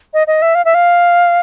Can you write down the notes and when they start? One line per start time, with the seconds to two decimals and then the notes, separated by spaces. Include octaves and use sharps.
0.14 D#5
0.27 D#5
0.42 E5
0.55 F5
0.65 E5
0.75 F5